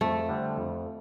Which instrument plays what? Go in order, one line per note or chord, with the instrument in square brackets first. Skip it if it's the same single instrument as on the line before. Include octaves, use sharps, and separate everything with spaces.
[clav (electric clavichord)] F2 [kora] A3
[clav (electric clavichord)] D3 G3 C4
F2